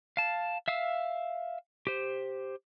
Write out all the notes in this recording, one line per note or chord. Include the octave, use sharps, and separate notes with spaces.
F5 A5
E5 F5 E6
G4 C5